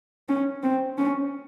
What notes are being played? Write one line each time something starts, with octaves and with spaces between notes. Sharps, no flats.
C#4
C4
C#4